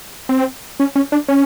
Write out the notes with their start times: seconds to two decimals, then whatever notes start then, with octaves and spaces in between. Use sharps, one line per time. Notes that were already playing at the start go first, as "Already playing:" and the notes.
0.29 C4
0.80 C#4
0.96 C#4
1.12 D4
1.28 C#4